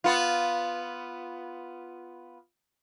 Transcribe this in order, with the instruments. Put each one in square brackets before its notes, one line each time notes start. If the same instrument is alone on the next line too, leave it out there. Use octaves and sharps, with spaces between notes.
[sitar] B3 F4